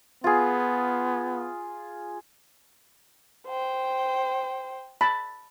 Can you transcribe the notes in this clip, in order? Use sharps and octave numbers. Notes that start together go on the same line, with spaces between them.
B3 F4 G#4
C5 G5
A5 B5